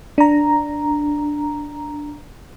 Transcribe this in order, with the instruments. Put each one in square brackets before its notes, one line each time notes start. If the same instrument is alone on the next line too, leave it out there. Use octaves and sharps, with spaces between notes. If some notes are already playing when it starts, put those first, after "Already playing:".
[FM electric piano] D4 A#5